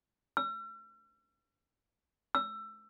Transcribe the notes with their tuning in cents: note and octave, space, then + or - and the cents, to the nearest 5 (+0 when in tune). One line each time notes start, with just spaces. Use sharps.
E6 +45
E6 +20